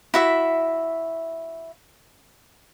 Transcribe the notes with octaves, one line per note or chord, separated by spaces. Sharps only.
E4 F#4 E5